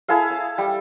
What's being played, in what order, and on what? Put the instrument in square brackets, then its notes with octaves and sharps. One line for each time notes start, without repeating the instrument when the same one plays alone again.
[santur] E4 G#4 A4 F5
A5
G3